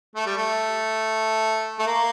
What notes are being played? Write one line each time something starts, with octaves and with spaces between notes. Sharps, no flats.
A3
G3
A3
A3
A#3